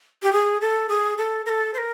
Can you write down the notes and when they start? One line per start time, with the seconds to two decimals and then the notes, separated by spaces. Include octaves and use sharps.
0.23 G4
0.33 G#4
0.61 A4
0.89 G#4
1.18 A4
1.46 A#4
1.49 A4
1.74 C5
1.78 A#4